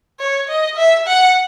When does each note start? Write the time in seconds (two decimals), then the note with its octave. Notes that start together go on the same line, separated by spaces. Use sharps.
0.20 C#5
0.49 D#5
0.77 E5
1.07 F#5